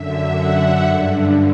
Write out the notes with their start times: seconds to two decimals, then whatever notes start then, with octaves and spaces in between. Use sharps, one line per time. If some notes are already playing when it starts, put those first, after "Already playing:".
Already playing: F#2 D3 E5
0.36 F#5
0.83 G2 D3